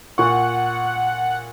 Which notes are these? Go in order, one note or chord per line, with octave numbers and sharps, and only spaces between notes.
A#2 F#5 C#6